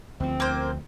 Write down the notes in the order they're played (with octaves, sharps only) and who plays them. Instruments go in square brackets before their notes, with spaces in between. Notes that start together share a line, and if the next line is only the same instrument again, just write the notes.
[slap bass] D2 F3 [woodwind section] C4
[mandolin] A#3 C5